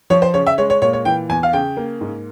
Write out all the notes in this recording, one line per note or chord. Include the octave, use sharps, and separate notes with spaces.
F3 C#5
C5
C#3 C#5
E5
G#3 C#5
C#5
A#2 C#5
C#5
E3 G5
E2 G#5
F5
C#3 G5
A#3
G#2